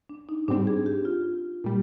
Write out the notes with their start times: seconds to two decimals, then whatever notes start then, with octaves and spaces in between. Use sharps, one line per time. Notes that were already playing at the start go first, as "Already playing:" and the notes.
0.09 D4
0.29 D#4
0.48 G#2 G3 C4 D4
0.67 G#4
0.86 G4
1.05 F4
1.64 A#2 G3